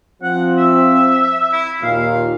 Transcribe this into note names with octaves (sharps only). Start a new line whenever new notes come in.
F3 C4 F#5
E5
E4
D#2 A#2 F5